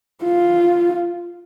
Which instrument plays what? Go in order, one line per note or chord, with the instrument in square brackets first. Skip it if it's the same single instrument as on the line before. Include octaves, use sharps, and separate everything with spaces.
[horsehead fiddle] F4